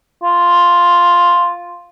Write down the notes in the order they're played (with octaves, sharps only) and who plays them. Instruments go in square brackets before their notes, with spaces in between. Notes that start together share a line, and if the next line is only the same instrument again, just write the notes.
[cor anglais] F4